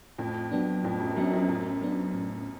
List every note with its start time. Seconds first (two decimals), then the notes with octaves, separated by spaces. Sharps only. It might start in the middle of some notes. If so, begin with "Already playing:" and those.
0.18 F2 A2
0.52 F#3 B3 D4
0.84 F2 A2
1.00 F#2
1.16 F#2 F#3 B3 D4
1.33 F2
1.49 F#2 A2
1.82 F#3 B3 D4
2.14 A2